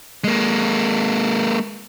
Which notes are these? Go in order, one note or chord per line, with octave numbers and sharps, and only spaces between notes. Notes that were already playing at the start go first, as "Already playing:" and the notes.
G#3 A#3